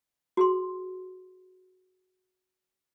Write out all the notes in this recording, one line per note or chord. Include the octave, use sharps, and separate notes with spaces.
F#4 G#4 C6